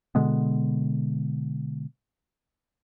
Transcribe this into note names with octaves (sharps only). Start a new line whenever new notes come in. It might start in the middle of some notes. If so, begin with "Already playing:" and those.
B2 D3 G#3 B3